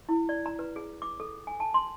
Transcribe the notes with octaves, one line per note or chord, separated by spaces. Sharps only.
E4
D5
A#5
B4
G#4
D6
A4
G#5
A5
C6